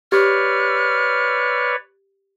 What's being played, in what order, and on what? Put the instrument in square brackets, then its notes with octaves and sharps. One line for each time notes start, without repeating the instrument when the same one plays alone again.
[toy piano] G4 [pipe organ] B4 C#5 D5 [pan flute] F6